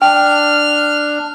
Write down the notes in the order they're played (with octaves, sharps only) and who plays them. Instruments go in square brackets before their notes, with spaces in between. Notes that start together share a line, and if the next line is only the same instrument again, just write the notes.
[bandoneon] D4 [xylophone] G5 [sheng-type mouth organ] F6